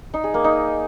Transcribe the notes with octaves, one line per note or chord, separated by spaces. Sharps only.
D#4
G#4
A#3
D#4